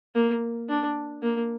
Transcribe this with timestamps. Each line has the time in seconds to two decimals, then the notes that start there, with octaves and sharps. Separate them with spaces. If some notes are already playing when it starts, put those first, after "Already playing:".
0.15 A#3
0.69 D4
1.22 A#3